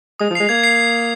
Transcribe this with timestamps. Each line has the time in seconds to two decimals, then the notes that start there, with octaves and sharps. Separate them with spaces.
0.20 G#3 D#6
0.30 F3
0.35 G#3 C7 F7
0.49 A#3 G#6
0.63 C7